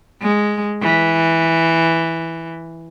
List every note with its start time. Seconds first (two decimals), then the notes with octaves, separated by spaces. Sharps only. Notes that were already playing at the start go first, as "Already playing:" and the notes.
0.22 G#3
0.82 E3